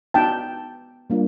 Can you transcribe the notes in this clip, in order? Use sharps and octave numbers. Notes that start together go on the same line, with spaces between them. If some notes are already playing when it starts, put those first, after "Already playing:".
B3 D#4 F#4 G5 A5
G3 A#3 D4 F4